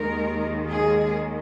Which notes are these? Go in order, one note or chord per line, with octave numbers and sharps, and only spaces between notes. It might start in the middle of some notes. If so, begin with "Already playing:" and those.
Already playing: D#2 D#3 G#3 A#4
G#4